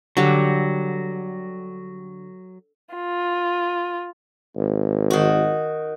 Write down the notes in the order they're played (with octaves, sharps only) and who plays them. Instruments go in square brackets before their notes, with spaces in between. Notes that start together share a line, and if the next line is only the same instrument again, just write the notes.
[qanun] D3 G3 G4 [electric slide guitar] F#3
[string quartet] F4
[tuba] G#1
[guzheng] D#3 F#4